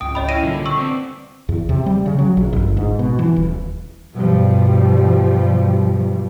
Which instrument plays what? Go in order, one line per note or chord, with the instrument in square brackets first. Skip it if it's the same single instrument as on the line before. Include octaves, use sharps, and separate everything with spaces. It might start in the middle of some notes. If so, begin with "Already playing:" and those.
[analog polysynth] G#1 C#2 [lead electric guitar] G5 [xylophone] D#6
[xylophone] C#5 D#5 B5
[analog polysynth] C#4 E4 F5 [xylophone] A#6 D#7 E7
[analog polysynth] C2 A#2 [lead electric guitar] D3
[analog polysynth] C4 [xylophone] C#6 E6
[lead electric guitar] B3 D5
[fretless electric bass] E2
C3
G3
C#3
F#3
A#1
G1
G#2
B2
E3
D#1
[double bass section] G2 B2 F3 G3